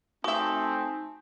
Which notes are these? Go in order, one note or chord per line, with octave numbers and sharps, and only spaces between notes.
A3 C4 D#4 F#4 E5 G#5 A5